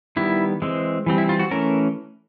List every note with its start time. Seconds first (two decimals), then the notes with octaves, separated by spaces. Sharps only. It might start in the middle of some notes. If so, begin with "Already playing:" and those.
0.17 D#3 G3 B3 E4
0.62 E3 G#3 C4
1.06 E3 G3 C4
1.18 E4
1.29 F4
1.39 F#4
1.51 E3 A3 C#4 A#4